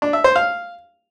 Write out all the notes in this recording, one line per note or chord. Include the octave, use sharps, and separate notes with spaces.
D4
E5
C5
F5